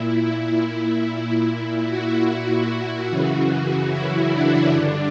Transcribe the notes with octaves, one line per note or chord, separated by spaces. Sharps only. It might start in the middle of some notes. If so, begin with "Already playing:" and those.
Already playing: A#2 E4
E4
A#2 E4
F#4
F#4
F#2 C#3 E3
E4
D4
G2 D3